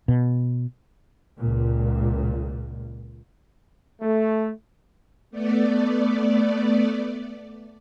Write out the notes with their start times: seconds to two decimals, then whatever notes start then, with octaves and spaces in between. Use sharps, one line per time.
0.08 B2
1.39 C#2 A#2
4.02 A3
5.31 A3 B3 D5